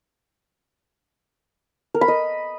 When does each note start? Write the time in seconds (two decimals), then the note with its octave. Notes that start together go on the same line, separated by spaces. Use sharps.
1.95 A#4
2.01 B5
2.08 D#5